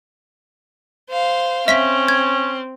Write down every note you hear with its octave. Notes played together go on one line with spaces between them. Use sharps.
C5 F5
C4 C#4 E5 B6
G#6